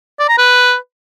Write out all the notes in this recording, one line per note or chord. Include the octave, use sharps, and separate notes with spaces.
D5
A#5
B4